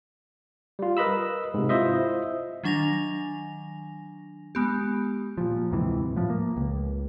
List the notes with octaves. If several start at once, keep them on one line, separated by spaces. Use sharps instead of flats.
G3 F4
A#4 B4 D#5 B5 E6
G#2 C3
E4 F4 C5 D#5 E5
D#3 F#3 D4 G#5 A#6 F7
G#3 B3 G4
A#2 F3
D2 G#2 C3 E3
A2 F3
A#3
C#2